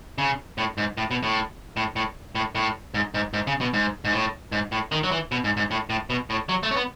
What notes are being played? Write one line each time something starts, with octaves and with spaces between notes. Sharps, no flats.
C#3
A2
G#2
A2
B2
A2
A2
A2
A2
A2
G#2
G#2
G#2
C#3
B2
G#2
G#2
A2
G#2
A2
D#3
F#3
E3
B2
G#2
G#2
A2
A2
B2
A2
F#3
A3
C#4
B3